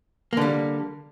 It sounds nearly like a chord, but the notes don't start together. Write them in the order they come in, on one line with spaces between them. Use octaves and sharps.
A#3 D3 G3